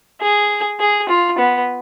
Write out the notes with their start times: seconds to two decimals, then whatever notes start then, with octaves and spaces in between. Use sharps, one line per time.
0.21 G#4
0.80 G#4
1.09 F4
1.39 B3